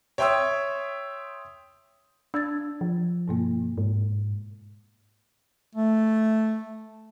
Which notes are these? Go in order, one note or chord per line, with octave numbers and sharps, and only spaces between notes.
C#5 E5 G5 C6 D#6 E6
D4 E6 G#6 A6
F3
G2 B2 A#3
G#2
A3